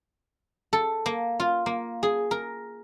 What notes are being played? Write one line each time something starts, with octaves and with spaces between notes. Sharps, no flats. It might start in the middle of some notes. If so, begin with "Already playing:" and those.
A4
A#3
F4
A#3
G#4
A#4